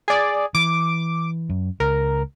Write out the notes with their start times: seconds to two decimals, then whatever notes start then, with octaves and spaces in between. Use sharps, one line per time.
0.08 G#4 D5
0.55 E3 D6
1.49 F#2
1.80 C#2 A#4